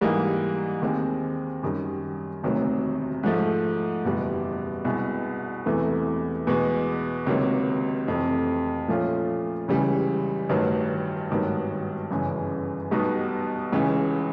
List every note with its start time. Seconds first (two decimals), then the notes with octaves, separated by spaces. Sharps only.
0.01 G#2 E3 G3 A#3 D#4
0.82 D#2 D#3 G#3 C4
1.63 F#2 D#3 G3
2.43 E1 D2 C3 D#3 F#3
3.23 G#2 F3 A3
4.05 F#1 E2 B2 G3
4.85 C2 B2 G#3
5.66 E1 E2 C3 E3 A3
6.47 E2 B2 G#3
7.27 C#2 C3 D#3 F#3 A#3
8.08 F2 C3 E3 A3
8.88 A#2 F3 A3 C#4 F4
9.68 C#2 C#3 E3 G3
10.49 A1 G2 D#3 F#3
11.30 G#1 G2 D#3 F#3 B3
12.11 G1 F#2 C#3 E3 G#3
12.91 B1 B2 G3 B3 D#4
13.72 C#2 C#3 E3